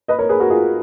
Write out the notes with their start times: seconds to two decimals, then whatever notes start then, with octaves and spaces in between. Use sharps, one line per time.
0.08 B4 D#5
0.19 A#4 C#5
0.29 G#4 B4
0.40 F#4 A#4
0.50 F4 G#4